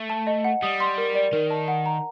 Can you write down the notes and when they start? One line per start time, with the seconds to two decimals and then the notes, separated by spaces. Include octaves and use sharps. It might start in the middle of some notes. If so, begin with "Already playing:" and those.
Already playing: A3
0.10 A5
0.27 D#5
0.44 F#5
0.62 G3 D#6
0.80 C6
0.98 A#4
1.15 D5
1.33 D#3 A#4
1.50 A5
1.68 F#5
1.86 A#5